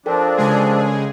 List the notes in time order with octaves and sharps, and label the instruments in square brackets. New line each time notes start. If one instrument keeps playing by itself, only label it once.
[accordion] F3 C4 D4 [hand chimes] A4 A#4 G5
[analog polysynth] C#3 G#3 G#4